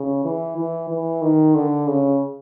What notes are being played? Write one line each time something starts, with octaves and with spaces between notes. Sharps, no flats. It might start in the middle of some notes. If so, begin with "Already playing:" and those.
Already playing: C#3
E3
E3
E3
D#3
D3
C#3